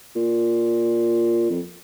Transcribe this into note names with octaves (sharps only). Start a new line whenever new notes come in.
A#2
F2